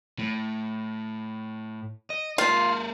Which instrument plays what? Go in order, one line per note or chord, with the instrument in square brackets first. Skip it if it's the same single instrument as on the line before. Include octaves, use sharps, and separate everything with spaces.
[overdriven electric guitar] A2
D#5
[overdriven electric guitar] A#3 A4 [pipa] F4